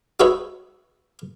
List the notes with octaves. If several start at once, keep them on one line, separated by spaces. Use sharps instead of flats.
D#4 F#4 G#4 B4 C#5 E5